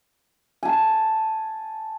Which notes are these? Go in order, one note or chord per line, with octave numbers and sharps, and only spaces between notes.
G#5 A5